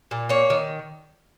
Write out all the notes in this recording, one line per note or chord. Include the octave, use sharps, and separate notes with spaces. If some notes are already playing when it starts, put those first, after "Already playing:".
A#2
A#3 C#5
D#3